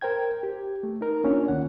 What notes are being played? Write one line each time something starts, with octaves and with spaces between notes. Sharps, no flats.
A#4 C5 G5 G#6
G4
A3
D#4 A#4
A#3 C#4 D4 F4 C#5
D2 D#3 F#5